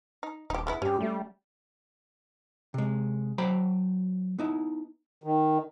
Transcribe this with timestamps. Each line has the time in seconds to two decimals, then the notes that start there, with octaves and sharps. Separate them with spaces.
0.23 D#4
0.50 D#1 D#4 G4
0.67 G#3 B3 E4
0.82 G2 C#4 G4
1.00 G3 A3
2.74 C3 G#3
3.38 F#3 C5 G5 A#5 B5
4.39 B3 D#4 E4
5.24 D#3